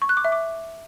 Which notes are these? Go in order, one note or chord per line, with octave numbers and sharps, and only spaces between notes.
C#6
F#6
D6
E5
D6